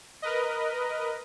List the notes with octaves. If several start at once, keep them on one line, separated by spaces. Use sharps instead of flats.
A#4 B4 D#5